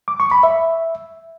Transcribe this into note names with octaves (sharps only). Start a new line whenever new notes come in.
D6
C#6
B5
E5